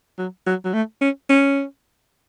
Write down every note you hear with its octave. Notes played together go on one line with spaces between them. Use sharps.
F#3
F#3
F#3
A3
C#4
C#4